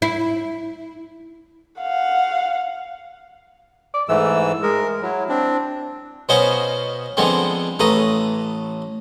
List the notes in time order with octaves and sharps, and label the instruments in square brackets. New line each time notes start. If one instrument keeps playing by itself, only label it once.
[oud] E4
[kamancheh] F5 F#5
[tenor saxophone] D5
[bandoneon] G#2 E3 E6 [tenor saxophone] A3
[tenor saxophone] G#3 [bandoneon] A#4
[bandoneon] F#3 [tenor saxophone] E4
[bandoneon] C4 D4
[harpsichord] B2 B3 C#4 C5 D#5 F5
D3 F3 G#3 B3 C4
A1 A3 B4 A#5 D#6